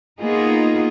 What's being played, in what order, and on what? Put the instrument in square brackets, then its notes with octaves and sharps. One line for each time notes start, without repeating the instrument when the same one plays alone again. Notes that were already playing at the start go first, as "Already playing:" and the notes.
[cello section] A#3 B3 D#4 F4 G#4